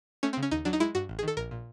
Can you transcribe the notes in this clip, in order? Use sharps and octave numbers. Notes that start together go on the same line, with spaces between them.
A3 C#4
C4
C#3
C#4
D#2 D#4
F#3 D4
D#4
G#3 E4
G2 F#4
A1
G#4
D#3 A4
A#1 A#4
A#2